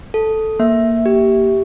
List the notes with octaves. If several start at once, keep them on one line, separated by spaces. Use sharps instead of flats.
A4
A#3 E5
G4